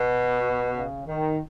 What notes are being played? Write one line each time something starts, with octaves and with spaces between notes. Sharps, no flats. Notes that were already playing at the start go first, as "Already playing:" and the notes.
Already playing: B2
C#3
D#3